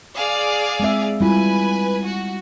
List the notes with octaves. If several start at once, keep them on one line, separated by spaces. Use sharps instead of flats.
G#4 D5 F5
G#3 C4 E5
G3 E4 F4 B4 G#5
F#4